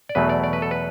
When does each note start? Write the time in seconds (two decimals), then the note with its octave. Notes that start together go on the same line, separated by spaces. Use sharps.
0.09 D5
0.15 E2 B2 F#3 A3 B4
0.29 D5
0.43 D5
0.53 B4
0.62 A4
0.71 B4